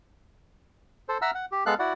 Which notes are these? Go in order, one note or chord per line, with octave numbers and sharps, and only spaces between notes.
A4 C5
E5 F#5 A#5 E6 F6
F#5
G4
G#3 B3 A4 F5 F#6
E4 F#4 D5 F#5